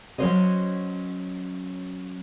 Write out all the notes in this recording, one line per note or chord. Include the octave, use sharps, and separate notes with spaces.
F#3 C#4 F#4 C5 C#5 D#5